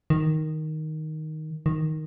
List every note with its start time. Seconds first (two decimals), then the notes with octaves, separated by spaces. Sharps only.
0.10 D#3
1.66 D#3